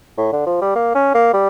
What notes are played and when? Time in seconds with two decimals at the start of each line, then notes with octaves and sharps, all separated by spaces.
0.17 A2
0.32 D3
0.46 F3
0.61 G3
0.75 A#3
0.95 C#4
1.14 A#3
1.33 G3